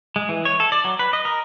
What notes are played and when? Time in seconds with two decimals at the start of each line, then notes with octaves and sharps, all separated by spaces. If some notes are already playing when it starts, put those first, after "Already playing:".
0.16 G#3
0.29 E3
0.45 C#5
0.60 A4
0.72 D5
0.84 F#3
0.99 B4
1.13 D#5
1.25 A#4